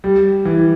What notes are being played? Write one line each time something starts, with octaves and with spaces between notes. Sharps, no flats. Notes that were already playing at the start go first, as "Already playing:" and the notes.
G3
E3